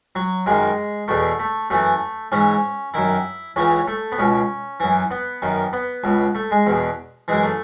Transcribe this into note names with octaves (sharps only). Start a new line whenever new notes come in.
F#3
F#2 D#3 G#3
E2 B2 A3
A3
F#2 E3 A3
G#2 E3 C#4
F#2 D#3 E4
C#2 C#3 E3 C#4
A3
B3
C#2 B2 C#4
F#2 E3
B3
F#2 D#3
B3
C#2 B2
A3
G#3
E2 B2
F#2 E3 G#3
A3